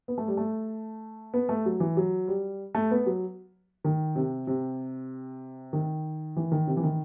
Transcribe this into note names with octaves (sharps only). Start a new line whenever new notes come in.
B3
A3
G3
A3
B3
A3
F#3
E3
F#3
G3
A3
B3
F#3
D#3
C3
C3
D#3
E3
D#3
C3
E3
D#3